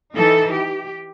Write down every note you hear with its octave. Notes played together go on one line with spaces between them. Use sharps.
E3 D#4 A4
G4